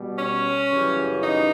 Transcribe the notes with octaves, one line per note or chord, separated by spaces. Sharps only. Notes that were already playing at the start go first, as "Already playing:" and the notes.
Already playing: B2 G3
C#4
F#2 C#3 E3 G3
D#4